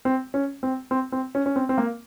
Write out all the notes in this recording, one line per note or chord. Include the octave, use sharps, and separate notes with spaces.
C4
C#4
C4
C4
C4
C#4
C#4
C4
C4
A#3